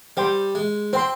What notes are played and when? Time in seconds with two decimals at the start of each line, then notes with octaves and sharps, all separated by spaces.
0.17 G3 C5 G5 C6
0.55 G#3
0.93 C4 C5 G5 C6